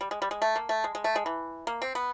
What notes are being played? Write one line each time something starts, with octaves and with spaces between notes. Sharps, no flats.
G3
G#3
G3
G#3
A3
A#3
A3
G#3
G#3
A3
G#3
E3
A#3
C4
B3